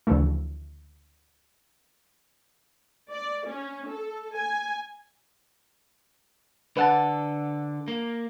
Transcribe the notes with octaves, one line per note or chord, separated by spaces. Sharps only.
D2 C#3 E3 F3 A3
D5
C#4
A4
G#5
D3 A4 B4 F#5 A5
A#3